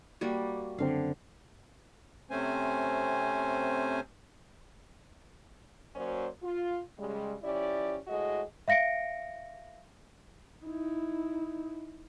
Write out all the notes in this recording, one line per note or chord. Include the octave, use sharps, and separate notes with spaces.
G3 A#3 F#4
F#1 D3 C4 F5
C3 A3 C4 C#4 C5 G#5
F#3 A#3 C#4 F#4 C5 D5
F4
C#3 G3 G#3
F3 C#4 E4 G4 D5
A2 G#3 F#4 G#4 D#5
E5 F5 A#6 C#7 D7
D#4 E4